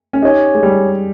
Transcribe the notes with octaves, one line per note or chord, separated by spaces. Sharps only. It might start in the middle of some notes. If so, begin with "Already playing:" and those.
C#4
D#4 G4 C#5 G#5
G#3
G3